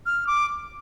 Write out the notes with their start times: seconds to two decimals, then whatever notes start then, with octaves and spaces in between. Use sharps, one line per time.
0.06 F6
0.27 D6